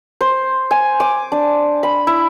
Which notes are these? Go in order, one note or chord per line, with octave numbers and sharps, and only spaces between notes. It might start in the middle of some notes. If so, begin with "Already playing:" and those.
C5
G#5
D6
D4
B5
E4